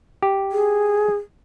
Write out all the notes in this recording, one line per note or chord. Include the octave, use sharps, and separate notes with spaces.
G4
G#4